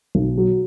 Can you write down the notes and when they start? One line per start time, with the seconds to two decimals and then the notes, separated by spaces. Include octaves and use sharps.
0.15 B1
0.37 F#3